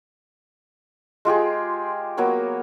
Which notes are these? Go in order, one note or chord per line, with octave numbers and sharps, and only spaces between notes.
G#3 F4 G4 G#4
F#3 A#3 B3 C#5